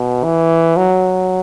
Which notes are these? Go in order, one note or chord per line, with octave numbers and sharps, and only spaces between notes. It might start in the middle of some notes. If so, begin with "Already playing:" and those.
Already playing: B2
E3
F#3